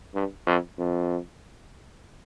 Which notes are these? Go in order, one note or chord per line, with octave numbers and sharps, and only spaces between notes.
G2
F2
F2